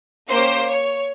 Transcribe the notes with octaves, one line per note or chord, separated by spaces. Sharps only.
A#3 C#4 G4 C5
C#5